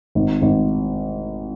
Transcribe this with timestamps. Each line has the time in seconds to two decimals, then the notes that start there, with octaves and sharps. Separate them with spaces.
0.15 G#1
0.42 G#1